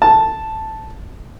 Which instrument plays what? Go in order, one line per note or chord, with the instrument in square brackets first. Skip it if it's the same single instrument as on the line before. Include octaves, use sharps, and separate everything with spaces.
[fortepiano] A5